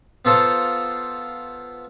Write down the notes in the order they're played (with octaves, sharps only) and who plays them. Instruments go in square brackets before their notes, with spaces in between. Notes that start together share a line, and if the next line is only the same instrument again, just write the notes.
[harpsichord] B3 F4 A4 C5 A#5